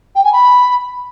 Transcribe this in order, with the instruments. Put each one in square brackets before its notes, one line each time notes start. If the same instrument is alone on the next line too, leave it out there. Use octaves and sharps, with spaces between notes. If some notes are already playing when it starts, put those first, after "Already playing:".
[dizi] G5
G#5
B5